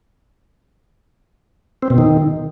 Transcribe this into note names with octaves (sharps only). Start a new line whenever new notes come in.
C4
B2
D#3